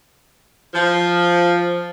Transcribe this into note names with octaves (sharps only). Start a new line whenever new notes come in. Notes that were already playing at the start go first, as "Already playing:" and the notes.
F3